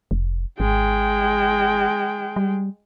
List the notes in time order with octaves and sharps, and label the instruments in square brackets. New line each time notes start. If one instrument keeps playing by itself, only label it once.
[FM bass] F1
[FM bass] G#1 [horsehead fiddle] G#3 G5
[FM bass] G3